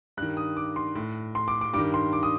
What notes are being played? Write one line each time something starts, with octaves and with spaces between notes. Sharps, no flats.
G2 D#3 F#6
D#6
D6
C6
A2
C6
D6
D6
G2 D#3 D6
C6
D6
D#6